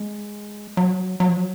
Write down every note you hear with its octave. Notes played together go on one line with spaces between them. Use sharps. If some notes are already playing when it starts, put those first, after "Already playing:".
Already playing: G#3
F#3
F#3
F3
F#3